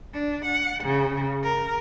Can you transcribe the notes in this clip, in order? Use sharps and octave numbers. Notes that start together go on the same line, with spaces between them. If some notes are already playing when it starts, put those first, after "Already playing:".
D4
F#5
C#3
A#4